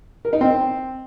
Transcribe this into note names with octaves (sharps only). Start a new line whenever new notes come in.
A#4
D#4
C4